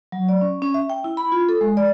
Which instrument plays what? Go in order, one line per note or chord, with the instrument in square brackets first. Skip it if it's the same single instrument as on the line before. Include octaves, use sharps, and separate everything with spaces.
[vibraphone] F#3
D5
C#4
C#4
E5
G5
E4
B5
F4
A4
G#3
D5